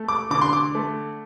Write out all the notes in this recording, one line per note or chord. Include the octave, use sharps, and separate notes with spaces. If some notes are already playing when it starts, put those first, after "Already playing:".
Already playing: A3
D6
D3 D6
C6
D6
A3